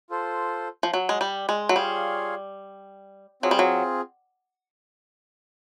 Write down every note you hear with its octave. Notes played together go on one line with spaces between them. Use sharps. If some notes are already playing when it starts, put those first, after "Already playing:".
F4 A4 C5
F3
F#3
G#3
G3
G#3
F#3
G3 F4 G#4 C#5 F5
F#3 C4 F4 G#4
G3
F#3